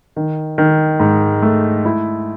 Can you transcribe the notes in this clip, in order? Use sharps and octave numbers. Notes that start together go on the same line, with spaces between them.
D#3
D#3
G#2
A3
E4